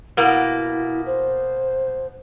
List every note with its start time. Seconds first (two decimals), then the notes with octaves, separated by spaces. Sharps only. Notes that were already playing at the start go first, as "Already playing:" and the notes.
0.17 B2 A#3 E4
1.06 C5